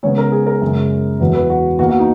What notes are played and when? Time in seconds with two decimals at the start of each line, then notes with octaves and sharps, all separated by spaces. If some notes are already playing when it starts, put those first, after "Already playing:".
0.03 C#3 G#3 B3 C#5
0.18 A#4
0.32 G#4
0.47 A#4
0.62 F#2 C#3 G#3
1.20 E2 B2 F#3 B3
1.34 B4
1.50 F#4
1.79 B2 A#3 F#4
1.89 F#4
1.99 D#4